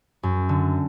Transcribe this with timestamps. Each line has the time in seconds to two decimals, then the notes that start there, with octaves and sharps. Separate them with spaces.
0.23 F#2
0.49 D3